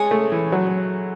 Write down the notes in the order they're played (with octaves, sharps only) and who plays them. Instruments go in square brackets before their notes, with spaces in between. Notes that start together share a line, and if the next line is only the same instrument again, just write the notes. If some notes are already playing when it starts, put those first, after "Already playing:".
Already playing: [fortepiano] G#3 [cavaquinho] C#5 G#5 D#6
[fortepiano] A3
E3
F#3